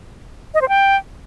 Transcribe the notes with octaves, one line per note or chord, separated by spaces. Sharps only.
D#5
C5
G5